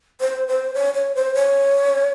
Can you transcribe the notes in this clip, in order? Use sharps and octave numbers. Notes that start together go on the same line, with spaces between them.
C5
C5
C#5
C#5
C5
C#5